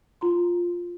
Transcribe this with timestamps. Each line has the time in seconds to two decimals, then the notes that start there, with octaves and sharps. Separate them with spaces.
0.21 F4 A#5 C6